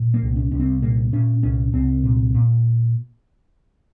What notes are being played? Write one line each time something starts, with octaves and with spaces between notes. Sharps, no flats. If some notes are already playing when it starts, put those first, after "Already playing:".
Already playing: A#2
A#3
C2
C#4
C2 C#4
C4
A#2 A#3
A#2 C#4
C2 C#4
C2 C4
A#2
A#2